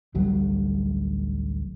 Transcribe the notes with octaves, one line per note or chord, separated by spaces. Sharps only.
A1 D2 F#3 G3